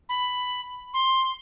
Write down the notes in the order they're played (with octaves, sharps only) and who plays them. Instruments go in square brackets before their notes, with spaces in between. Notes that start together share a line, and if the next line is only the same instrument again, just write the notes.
[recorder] B5
C6